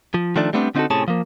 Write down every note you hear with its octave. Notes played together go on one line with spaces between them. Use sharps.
F3
D#3 F3 A3 D4
G3 A3 B3 C4 D4
D3 C4 D#4 F4 F#4 A4
A2 C3 C#4 G#4 A5
F3 A#3